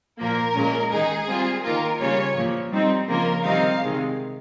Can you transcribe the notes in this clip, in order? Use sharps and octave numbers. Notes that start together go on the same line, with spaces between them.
A#2 F3 A#3 A#4
A#2 G#3 C#4
D#3 G#3 D#4 G#4
G3 C4 F4
D#3 A#3 F4 A#4
C#3 G3 A#3 C#4 F4 C#5
A#2 F3 A#3
G3 C4 D#4
C#3 F3 A#3 F4 A#4
C3 D#3 G3 C4 D#4 F5
C3 D#3 G#3